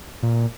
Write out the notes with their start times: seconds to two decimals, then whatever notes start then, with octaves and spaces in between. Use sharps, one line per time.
0.23 A#2